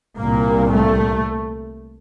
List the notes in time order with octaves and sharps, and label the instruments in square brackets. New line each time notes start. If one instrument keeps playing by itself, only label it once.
[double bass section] C2 A#2 A#3
A3